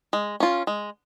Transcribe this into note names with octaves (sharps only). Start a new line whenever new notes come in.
G#3
C#4 F4
G#3